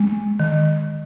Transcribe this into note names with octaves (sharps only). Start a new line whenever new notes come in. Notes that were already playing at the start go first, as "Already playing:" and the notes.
Already playing: G#3
D#3